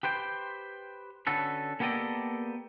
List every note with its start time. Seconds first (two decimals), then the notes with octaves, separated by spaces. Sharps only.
0.03 G4 B4 C5 G5
1.27 D3 C#4 F#4 A4 B4
1.80 A#3 B3 G4 A4 D5 D#5